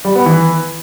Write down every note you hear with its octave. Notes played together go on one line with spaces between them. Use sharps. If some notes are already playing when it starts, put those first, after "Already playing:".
G3
B3
E3